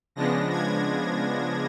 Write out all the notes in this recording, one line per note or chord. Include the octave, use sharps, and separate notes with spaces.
C#3 F3 G#3 B3 D4 A#6
G#6